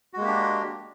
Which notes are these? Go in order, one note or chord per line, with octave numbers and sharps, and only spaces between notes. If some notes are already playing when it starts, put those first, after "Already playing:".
G#3 A#3 D4 F#4 G4